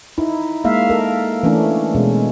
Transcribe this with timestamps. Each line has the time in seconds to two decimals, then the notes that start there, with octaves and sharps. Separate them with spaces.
0.18 D#4 E4
0.64 G#3 A#3 E5 F5
0.90 A4 A#4
1.43 E3 A3 C#4 D4
1.95 B2 G#3 C#4